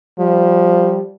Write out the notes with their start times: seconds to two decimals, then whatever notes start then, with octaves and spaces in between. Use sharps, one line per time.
0.20 F3 G3